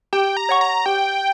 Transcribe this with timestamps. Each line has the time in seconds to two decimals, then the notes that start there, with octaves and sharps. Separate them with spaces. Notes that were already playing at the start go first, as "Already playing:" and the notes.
0.13 G4 G5
0.37 A#5
0.49 C#5 F#5 C#6
0.61 A#5
0.86 G4 G5